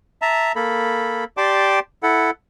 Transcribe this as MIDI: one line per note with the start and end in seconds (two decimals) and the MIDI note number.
0.22 0.52 76
0.22 0.52 81
0.22 0.52 82
0.56 1.24 58
0.56 1.24 69
0.56 1.24 83
1.37 1.80 67
1.37 1.80 74
1.37 1.80 79
1.37 1.80 81
1.37 1.80 84
1.37 1.80 86
2.03 2.30 64
2.03 2.30 69
2.03 2.30 78